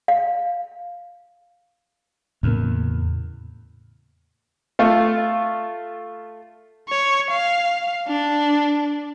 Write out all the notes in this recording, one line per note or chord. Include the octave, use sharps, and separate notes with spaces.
F5
E2 A2 C#3 A#3
A3 F4
C#5
F5
D4